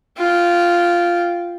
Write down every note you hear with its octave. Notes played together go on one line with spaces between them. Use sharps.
F4 G5